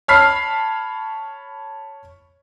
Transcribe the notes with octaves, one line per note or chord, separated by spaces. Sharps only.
C#5 A5 B5 F6 B6 C7